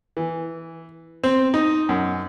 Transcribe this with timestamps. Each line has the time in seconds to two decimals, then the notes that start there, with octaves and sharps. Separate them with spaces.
0.17 E3
1.23 C4
1.54 D#4
1.89 F#2